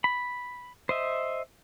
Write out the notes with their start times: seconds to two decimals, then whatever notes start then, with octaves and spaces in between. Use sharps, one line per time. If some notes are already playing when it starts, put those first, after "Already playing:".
0.04 B5
0.89 C5 D#5 E5